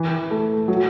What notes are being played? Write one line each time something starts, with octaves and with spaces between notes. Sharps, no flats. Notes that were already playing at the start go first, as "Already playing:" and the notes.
Already playing: E3
A3
F#3